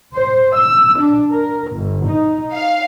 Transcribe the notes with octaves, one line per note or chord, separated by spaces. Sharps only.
C5
E6
D4
A#4
G1
D#4
F5